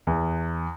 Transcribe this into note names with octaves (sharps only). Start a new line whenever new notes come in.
E2